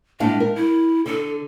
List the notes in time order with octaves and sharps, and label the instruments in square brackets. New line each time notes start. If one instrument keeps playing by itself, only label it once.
[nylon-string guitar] A2 D4 F5 [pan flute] G#3
[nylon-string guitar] A#4
[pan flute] E4
[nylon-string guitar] D3 [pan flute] A4